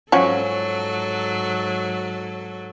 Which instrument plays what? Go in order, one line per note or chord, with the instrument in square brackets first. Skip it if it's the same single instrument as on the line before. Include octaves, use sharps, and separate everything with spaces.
[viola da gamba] G#2 F#3 A4 [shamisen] F3 C#4 F#4